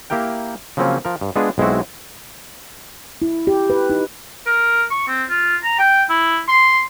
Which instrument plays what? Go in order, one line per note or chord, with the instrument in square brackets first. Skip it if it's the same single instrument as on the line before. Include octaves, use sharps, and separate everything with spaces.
[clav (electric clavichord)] A#3 E4 G4 A#4 G5
C#3 F3 F#3 A#3 C4 C#4
F3 A#4
G2
G#3 B3 D4 F4 G#4
B1 G#3 C4 E4 F#4
[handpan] E4
G4
B4
D#4
[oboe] A#4
C#6
C4
F4
A#5
G5
E4
C6